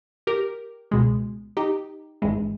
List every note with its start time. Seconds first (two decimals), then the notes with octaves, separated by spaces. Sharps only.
0.27 G4 A#4
0.91 C#2 B2 G#3
1.57 D#4 G4
2.22 G#1 G2 E3 G#3